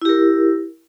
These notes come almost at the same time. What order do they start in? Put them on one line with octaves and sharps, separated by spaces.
E4 G4 A#4